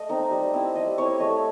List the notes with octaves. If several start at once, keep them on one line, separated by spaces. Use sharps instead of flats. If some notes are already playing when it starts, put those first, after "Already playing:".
Already playing: A3 D#5
C4 D#4
G3
C4 E4
G3 D#5
C4 E4 C#5
A3 D#5